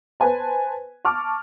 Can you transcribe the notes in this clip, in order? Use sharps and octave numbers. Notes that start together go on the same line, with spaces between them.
B4 C5 G#5 A5
A5 C#6 D6 F6